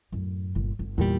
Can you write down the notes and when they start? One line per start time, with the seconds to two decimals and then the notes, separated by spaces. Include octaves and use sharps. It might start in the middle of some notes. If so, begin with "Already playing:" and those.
0.12 F#2 A2
0.55 G1 A#2
0.79 G1
0.98 E2 A#2 G3